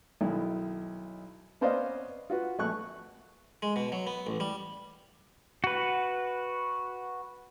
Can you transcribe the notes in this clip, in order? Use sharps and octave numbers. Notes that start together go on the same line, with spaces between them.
B1 D#3 E4
B3 C#4 C5 D5 D#5 F5
F4 F#4 B4
A#1 A3 C#6 F#6
G#3
B2
F#3
B3
A1
G3
F#4 B4